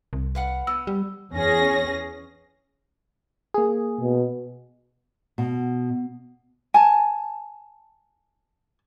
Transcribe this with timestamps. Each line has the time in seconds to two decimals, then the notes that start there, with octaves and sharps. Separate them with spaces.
0.13 C2
0.35 B4 F5 F#5
0.67 B3 E6
0.87 G3
1.33 E2 C#4 G#4 A#6
3.54 A#3 G#4
4.01 B2
5.38 B2
6.74 G#5 A5